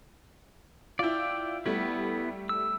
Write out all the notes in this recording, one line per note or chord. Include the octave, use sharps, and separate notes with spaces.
E4 F4 D5 G5
G3 A3 B3 E4
E6